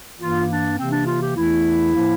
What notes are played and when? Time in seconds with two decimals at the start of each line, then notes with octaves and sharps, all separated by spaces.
0.18 G2 E3 A#3 F4
0.48 D4
0.78 C3 E3 A#3 C4
0.92 D4
1.07 F4
1.21 G4
1.36 E2 E3 A3 E4
1.94 A2 F3 A#3